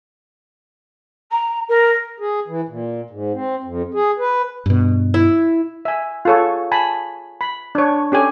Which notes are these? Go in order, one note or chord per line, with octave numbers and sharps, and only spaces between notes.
A#5
A#4
G#4
E3
A#2
G#2
C4
F2
G#4
B4
G2 B2
E4
E5 G#5
F4 G#4 A4 C#5
G#5 A5 B5
B5
D4 C#5
C#4 G4 A4 G#5